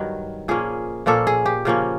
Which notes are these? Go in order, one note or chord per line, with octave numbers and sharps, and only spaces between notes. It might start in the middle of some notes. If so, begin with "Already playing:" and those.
Already playing: G2 D#3 F#3
A#2 F3 A#3 C#4 G#4
A#2 F3 A#3 C#4 A4
G#4
G4
C#3 F3 A#3 C#4